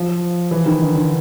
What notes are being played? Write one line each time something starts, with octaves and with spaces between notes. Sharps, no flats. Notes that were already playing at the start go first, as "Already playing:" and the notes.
Already playing: F3
E3
D#3
D3
D3